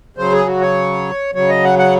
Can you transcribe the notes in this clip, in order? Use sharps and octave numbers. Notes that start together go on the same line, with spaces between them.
C#3 F#3 C5
G#4
F#4
C#5
C#3 F#3 C#5
D#5
F#5
F#5